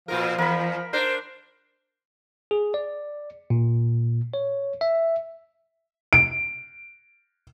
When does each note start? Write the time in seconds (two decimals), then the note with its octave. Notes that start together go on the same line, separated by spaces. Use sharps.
0.08 A#2 F3 F4 A#4
0.38 E2 A#4 B5
0.93 D4 A#4 C5
2.51 G#4
2.74 D5
3.50 A#2
4.34 C#5
4.81 E5
6.13 D7